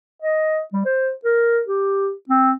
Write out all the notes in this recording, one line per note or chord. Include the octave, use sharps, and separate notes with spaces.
D#5
G3
C5
A#4
G4
C4